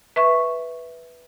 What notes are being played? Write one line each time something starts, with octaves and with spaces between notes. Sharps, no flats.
B4 E5 C#6